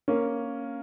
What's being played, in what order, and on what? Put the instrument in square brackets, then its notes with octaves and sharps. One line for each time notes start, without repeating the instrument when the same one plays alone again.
[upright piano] A#3 C#4